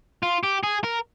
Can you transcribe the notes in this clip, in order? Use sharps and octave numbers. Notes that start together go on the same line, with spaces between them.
F4
G4
G#4
A#4